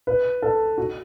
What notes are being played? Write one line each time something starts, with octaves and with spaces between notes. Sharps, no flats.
B4
A4
F#4